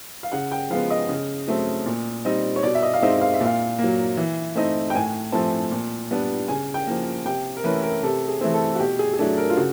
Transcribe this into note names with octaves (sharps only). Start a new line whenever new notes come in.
F5
C#3 F#5
G5
F3 G#3 B3 F5
D#5
C#3
F#3 A3 C4
A#2
G3 C4 D#4
C#5
B2 D5
E5
D#5
F5
G#3 C4 D#4 E5
F5
E5
A#2 F5
A#3
F#3
E3
A3 C4 D#4
G5
A2 G#5
F3 A3 C4 A5
A#2
G3 B3 D4
C#3 G#5
G5
F3 A#3
C3 G5
A#4
E3 A3 C#4 B4
A#4
C3 A4
G#4
E3 A3 C4
A4
F#4
B2 G4
G#4
G#4
F#3 A3 D4 A4
A#4
F4
C#3 F#4